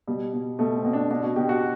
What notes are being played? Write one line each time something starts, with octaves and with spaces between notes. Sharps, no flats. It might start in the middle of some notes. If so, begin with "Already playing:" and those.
B2 G3
B2
B2 A3
C4
B2
D4
B2 D4
F#4
B2 G4
F#4